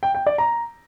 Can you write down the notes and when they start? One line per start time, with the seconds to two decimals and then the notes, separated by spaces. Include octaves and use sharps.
0.03 G5
0.15 G5
0.26 D5
0.38 A#5